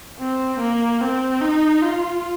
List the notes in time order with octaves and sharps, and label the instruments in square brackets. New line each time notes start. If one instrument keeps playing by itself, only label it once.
[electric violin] C4
A#3
C4
D#4
F4